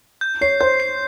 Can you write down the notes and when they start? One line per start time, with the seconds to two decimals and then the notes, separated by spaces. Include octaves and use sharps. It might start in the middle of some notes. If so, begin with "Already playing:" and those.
0.21 G6
0.41 C#5 C7
0.61 C5 G6
0.80 C7